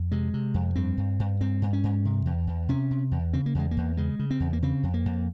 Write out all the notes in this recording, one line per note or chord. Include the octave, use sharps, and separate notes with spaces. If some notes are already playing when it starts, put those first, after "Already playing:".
Already playing: F2
C3 G#3
C3
F2
G2 C4
G2
G2
G2 C4
G2
C#4
G2
C3
E2
E2
C3 C#4
C3
E2
C#3 C4
A#3
E2 G#3
A#3
E2
C#3 G#3
C#3
C4
E2
A#3
C#3 C4
F2
A#3
F2